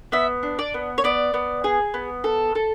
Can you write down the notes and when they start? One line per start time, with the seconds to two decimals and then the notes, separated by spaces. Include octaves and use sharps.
0.12 B3 E5
0.43 D4
0.59 D5
0.74 B3
0.98 C#5
1.04 B3 D5
1.34 B3
1.64 G#4
1.94 B3
2.24 A4
2.55 A4